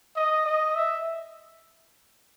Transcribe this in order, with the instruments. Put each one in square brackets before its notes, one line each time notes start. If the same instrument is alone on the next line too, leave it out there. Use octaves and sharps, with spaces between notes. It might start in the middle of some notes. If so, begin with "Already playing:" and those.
[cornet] D#5
D#5
E5